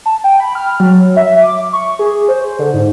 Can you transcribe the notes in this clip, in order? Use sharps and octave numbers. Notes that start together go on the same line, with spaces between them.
A5
G5
B5
F6
F#3
E5
D6
C#6
G#4
C5
D3
G#2